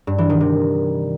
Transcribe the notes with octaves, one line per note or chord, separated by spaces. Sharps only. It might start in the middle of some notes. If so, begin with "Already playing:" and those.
G2
E3
D#3
C3